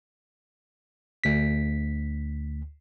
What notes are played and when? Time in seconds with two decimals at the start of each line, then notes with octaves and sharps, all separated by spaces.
1.24 D2 B6